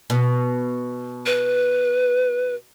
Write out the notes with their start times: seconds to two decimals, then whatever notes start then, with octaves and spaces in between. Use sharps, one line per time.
0.10 B2
1.26 B4